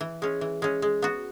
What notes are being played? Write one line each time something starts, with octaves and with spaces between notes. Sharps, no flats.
E3
G#3 C#4
E3
G#3 C#4
G#3
B3 F#4